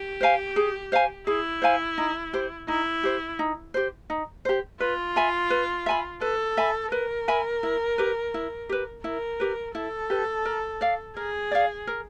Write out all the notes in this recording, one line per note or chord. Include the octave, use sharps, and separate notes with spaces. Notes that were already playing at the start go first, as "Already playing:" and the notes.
Already playing: G4
C5 F5 G#5
G#4
C5 F5 G#5
E4 G#4
C5 F5 G#5
D#4
G4 C5
D#4 E4
G4 C5
D#4
G4 C5
D#4
G4 C5
F4 B4
E5 G#5 B5
B4
E5 G#5 B5
A4 B4
E5 G#5 B5
A#4 B4
E5 G#5 B5
E4
G4 B4
E4
G4 B4
E4 A#4
G4 B4
E4 A4
G4 B4
A#4
D5 F5
G#4 A#4
D5 F5
A#4